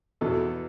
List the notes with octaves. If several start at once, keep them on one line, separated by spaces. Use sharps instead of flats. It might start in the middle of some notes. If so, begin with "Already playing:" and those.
E2 B2 A4